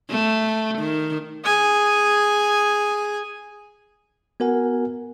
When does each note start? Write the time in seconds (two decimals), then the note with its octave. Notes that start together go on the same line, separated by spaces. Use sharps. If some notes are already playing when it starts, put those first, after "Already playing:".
0.10 A3
0.78 D#3
1.44 G#4 G#5
4.40 B3 F#4 A#4 F#5 G#5